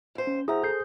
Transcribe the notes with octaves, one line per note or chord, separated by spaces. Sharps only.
D#2 C5
C#4
D2 E4 G#4 C5 E5 F#5 A#5
A4 D#6 G6 C7